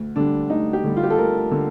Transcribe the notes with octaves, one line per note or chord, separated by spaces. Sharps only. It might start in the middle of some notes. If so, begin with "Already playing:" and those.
Already playing: D2
D3 G3 D4
D2 D#4
G4
D3 G3
F4
G4
A4
D2 A#4
D3